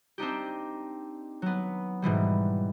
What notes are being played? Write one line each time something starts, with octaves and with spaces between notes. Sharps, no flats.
C4 D4 D#4 G4
F#3 B3
G#2 B2 E3 G3